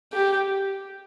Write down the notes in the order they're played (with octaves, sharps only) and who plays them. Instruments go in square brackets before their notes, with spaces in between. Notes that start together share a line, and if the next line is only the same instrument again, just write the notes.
[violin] G4